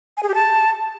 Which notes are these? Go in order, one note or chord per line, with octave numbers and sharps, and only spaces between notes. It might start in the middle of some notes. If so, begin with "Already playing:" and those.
G#5
G#4
G4
A5